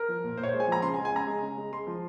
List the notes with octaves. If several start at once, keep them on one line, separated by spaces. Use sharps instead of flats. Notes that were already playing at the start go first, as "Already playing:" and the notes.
Already playing: A#4
F3
A#2
A#2 C5
C#5
G#3 C5
G#5
F3 A#5
C#3 C6
G#5
G#3
G#5
C#3 A#5
G#3
C#3
G#3
G#3 C6
F3